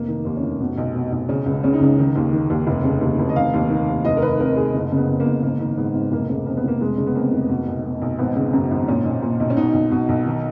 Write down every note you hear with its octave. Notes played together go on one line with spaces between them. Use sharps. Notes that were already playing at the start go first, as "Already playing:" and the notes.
Already playing: F1 A#3
D#3
D#2
C#4
F1
B2
B1
B2
B1
C#3 C#4
C#2
C#3 C#4
D#4
C#2 C#4
D#3
D#2
D#3
D#2
F1
C#3
D#2
F1
D#5
D#3 F5
D#2
D#3
D#2
F1 D#5
A#4
D#3 B4
F2 A#4
F1 G#4
F#1
C#3
B3
F2
A#3
F#1
G#1 A#3
D#3
G#2 B3
G#1
F1 A#3
C#3
F2 A#3
B3
F1 A#3
F1 G#3
C#3
B3
F2 A#3
F1
B2
B1
B2
B1
G#1 B3
C#3
F#2
G#1
A#2 C#4
B1
A#2
B1
C#4
B2 D#4
B1
B2
B1
D#3